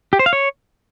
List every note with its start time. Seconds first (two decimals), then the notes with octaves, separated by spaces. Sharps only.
0.13 G4
0.19 C5
0.26 F5
0.33 C#5